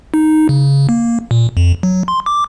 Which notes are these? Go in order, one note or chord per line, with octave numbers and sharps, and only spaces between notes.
D#4
C#3
A#3
A#2
F2
F#3
C6
D6